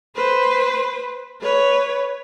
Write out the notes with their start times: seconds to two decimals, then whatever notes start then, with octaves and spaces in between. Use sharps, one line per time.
0.16 B4 C5
1.41 B4 C#5